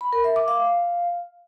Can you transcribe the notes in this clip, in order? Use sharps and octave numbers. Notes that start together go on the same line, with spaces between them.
B5
A#4
E5
D6
F5